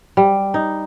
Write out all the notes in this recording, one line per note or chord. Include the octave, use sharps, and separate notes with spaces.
G3
D#4